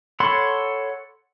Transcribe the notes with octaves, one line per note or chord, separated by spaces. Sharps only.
A4 C#5 F#5 B5 C6